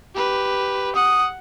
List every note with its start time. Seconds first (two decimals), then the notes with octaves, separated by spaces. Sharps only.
0.15 G4 B4
0.96 F#5 D#6